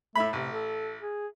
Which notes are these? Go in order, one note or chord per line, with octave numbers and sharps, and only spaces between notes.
A2 A3 E5 B5
A1 C3
A4
G#4